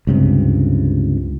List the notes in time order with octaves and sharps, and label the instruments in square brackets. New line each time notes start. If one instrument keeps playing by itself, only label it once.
[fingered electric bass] C#2 G2 C3